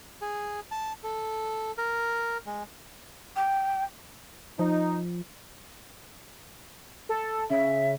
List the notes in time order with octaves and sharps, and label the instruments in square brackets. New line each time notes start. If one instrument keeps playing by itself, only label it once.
[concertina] G#4
A5
A4
A#4
G#3
[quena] G5
[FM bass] F3 [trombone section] D#4
[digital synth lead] A4
[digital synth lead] C#3 [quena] E5